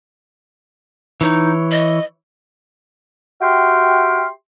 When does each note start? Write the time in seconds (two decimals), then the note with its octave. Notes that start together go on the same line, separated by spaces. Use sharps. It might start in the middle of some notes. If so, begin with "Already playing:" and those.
1.21 E3 D#4 C#5
1.72 D#5
3.41 F#4 G4 E5 G5 C6 F6